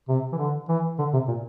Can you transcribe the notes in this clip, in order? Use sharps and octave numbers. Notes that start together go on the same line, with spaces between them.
C3
E3
D3
E3
D3
C3
A#2